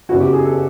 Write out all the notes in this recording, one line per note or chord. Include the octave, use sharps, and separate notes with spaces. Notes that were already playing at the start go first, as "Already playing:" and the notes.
F#1 E2 C#3 E3 F#4
G4
G#4
A4